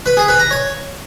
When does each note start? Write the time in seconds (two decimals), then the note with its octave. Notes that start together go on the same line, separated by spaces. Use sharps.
0.06 B4
0.17 G#4
0.28 B4
0.40 A#5
0.51 C#5